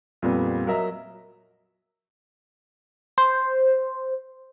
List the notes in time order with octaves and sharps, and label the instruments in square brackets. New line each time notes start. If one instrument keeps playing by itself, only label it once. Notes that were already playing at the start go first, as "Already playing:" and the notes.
[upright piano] F2 A#2 G3 B3
F#3 A#4 D#5 E5 A#5
[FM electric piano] C5